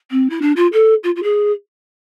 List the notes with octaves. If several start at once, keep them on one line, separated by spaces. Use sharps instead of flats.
C4
E4
D4
F4
A4
F4
F4
G#4